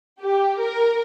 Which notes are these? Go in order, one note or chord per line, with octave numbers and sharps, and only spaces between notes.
G4
A#4